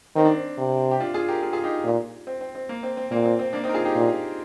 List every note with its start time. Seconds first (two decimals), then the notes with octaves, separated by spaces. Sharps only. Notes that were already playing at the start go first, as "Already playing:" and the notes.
0.16 D#3 C4
0.25 D4
0.34 C4
0.58 C3
0.91 G4
1.00 D4 F4
1.14 F4 G#4
1.28 G4 A#4
1.43 F4 G#4
1.53 F4 G#4
1.63 D#4 G4
1.84 A#2
2.27 C4
2.41 C4
2.55 C4
2.69 A#3
2.83 C4
2.97 C4
3.11 A#2 A#3
3.25 C4
3.39 C4
3.53 A#3 D4
3.64 C4 D#4
3.69 A#4
3.74 F4 G#4
3.85 D#4 G4
3.95 A#2